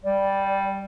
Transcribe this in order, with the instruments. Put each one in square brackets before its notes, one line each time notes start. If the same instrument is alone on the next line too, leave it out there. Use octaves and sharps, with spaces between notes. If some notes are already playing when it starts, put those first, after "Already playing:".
[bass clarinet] G3 [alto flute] D5